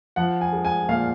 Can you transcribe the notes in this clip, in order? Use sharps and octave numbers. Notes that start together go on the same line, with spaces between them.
F3 F#5
G#5
G#3
G#5
A#2 F5